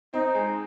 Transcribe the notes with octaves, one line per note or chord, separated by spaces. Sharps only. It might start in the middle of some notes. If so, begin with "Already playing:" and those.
C4 D#4
G#3